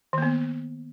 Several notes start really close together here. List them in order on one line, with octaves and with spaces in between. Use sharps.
D#3 A#3 B3